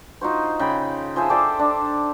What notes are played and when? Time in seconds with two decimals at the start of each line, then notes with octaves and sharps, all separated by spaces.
0.21 D#4 F4 F#4 C5
0.59 C#3 G5 B5
1.16 F3 G#4 C5 E5
1.30 G4 A4 C5 D5
1.59 D4